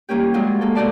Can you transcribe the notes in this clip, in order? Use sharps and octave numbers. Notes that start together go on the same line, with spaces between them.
E3 G3 A#3 C#4 G4
F3 F#3 G#3 D4 F4
G#3 A#3 A4
B2 A3 F#4 D5 A5